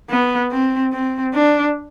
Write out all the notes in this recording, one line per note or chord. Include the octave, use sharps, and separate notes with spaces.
B3
C4
C4
D4